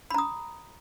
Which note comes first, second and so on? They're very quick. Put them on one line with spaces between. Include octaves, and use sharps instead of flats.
B5 A#5 D#6